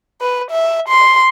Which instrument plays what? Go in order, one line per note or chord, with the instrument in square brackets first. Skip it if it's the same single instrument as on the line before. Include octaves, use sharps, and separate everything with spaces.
[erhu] B4
E5
C6